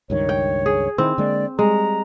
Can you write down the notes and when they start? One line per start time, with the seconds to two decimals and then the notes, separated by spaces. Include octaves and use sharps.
0.10 C#2 G2 D#3 C#5
0.29 G5
0.66 G#4
0.98 D#3 C4 E4
1.18 D3 G#3 A#3 D5
1.59 G3 G#3 A#5